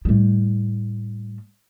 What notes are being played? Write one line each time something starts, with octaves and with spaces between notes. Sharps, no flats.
A2 G3